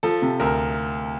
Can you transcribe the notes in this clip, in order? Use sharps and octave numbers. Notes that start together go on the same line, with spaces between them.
F3 A4
C3
D2 A#4